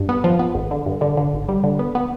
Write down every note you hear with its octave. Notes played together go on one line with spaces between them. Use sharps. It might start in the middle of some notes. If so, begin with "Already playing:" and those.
Already playing: G2
B3
F3
B3
G#1
D3
G2
D3
D3
G#1
G3
D3
B3
B3